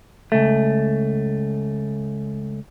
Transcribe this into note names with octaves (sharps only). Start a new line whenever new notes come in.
C#2 A3